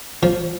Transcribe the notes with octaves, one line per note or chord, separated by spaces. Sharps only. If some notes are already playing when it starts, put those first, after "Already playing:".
F3